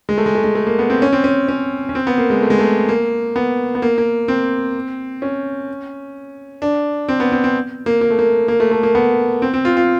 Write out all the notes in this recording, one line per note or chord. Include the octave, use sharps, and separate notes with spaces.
G#3
A3
G#3
A3
G#3
A3
A#3
B3
C4
C#4
C4
C#4
C#4
C#4
C4
B3
A#3
G#3
A3
G#3
A3
A#3
B3
B3
A#3
A#3
C4
C#4
D4
C4
B3
C4
C4
A#3
A#3
A3
A#3
A#3
A3
A3
A#3
B3
C4
C4
F4
F4